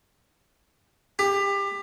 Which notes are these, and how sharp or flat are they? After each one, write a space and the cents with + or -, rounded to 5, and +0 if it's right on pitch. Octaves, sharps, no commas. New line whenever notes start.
G4 +25